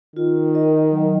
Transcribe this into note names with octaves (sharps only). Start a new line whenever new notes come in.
D#3 F4
A#4 D#5
F#3